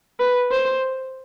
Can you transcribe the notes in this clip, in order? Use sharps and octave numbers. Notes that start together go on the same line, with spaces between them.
B4
C5